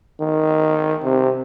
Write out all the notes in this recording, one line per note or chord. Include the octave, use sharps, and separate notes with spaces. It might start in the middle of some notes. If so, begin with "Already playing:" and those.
D#3
C3